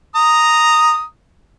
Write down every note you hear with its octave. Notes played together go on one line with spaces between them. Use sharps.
A#5 D#6